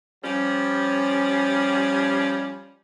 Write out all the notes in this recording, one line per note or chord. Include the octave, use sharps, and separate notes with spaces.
F3 G3 C#4